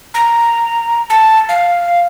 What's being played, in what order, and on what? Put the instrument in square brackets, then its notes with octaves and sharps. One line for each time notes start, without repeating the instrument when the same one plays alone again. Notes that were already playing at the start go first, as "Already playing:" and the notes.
[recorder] A#5
A5
F5